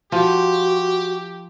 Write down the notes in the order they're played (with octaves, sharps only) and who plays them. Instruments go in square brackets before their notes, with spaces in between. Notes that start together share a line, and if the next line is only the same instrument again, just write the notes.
[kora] F3 [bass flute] F#4 [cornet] G4